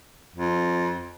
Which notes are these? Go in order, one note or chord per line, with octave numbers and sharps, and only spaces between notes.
F2